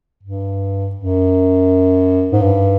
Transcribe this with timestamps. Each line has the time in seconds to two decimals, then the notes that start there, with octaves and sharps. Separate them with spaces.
0.23 G2
0.96 F#2
2.32 G#2
2.41 G2